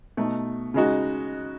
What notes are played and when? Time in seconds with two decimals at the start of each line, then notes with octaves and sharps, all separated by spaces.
0.17 B2 A3 D#4
0.74 C#3 G#3 D#4 F#4